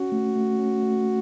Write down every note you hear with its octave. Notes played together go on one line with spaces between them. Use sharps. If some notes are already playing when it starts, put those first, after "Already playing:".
Already playing: C#4 F#4
A3
A3
C#4
A3
C#4